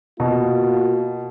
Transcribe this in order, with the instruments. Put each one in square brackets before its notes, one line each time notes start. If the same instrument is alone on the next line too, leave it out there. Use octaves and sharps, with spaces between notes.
[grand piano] B2 [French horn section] A#3 F4 F#4